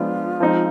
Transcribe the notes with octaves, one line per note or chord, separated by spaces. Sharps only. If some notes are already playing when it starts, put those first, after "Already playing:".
Already playing: F3 G#3 B3 D4 F4
F3 G#3 C4 D#4